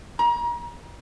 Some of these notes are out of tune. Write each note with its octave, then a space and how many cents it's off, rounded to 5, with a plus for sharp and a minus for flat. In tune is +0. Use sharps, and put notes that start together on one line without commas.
A#5 +35